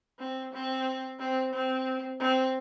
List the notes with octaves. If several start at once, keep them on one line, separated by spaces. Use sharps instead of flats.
C4
C4
C4
C4
C4